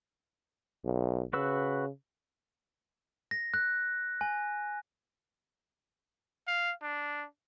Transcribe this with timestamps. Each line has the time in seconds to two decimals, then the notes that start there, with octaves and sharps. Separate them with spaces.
0.85 B1
1.33 C#3 F#4 B4 E6
3.31 A#6
3.54 F#6
4.21 G#5
6.47 F5
6.82 D4